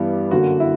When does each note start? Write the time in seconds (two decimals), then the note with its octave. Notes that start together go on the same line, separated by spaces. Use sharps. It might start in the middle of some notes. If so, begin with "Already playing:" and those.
Already playing: G2 E3 G3 B3
0.31 F#2 D3 A#3 F#4
0.60 E4